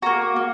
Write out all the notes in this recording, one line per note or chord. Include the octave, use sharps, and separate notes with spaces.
A#3 F#4 A#5
A#3